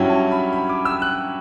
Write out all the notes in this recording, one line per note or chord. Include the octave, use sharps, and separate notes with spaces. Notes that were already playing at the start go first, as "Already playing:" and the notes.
Already playing: G2 F#3 C#4 E4 G5
A5
B5
B5
D6
E6
F#6